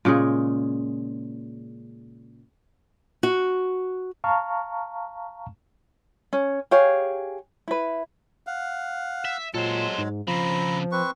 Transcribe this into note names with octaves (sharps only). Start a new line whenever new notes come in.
A#2 C#3 G#3 G#4
F#4
F5 A5 A#5 C#6 F6
C#4
G4 G#4 C#5 F5
E4 B4
F5 F#5
E5
A#2 F#3 G#3 A4 C5
G#2
C#3 F3 C4 A#5 B5
C4 B4 C#6